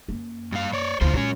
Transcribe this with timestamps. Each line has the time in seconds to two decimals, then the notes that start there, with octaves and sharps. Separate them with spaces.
0.08 F#2 A#3
0.52 G2 F5
0.73 C#5 D5
1.01 D2 A#3 E4 F4 C5
1.13 A#2 F#3 G#3 C#4